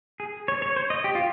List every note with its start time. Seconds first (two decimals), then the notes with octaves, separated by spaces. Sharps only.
0.20 G#4
0.48 C#5
0.62 C#5
0.76 C5
0.90 D#5
1.04 G4
1.15 F4